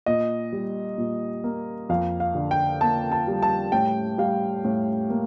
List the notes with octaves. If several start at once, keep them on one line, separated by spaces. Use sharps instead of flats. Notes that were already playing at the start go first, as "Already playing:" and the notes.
A#2 D#5
G3
A#2
A#3
F2 F5
F5
D3
G5
A#3 A5
A5
G3
A5
A2 G5
G3 F5
A2
A#3